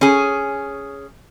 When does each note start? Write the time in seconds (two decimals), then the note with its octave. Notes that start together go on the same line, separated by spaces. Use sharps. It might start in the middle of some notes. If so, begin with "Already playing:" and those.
0.01 C#4 G#4